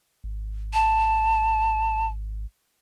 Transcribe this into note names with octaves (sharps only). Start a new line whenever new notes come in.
G#1
A5